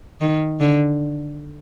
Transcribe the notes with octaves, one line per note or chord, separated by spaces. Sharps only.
D#3
D3